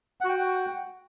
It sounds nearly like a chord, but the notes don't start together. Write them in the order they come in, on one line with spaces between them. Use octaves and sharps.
F#5 F#4 G5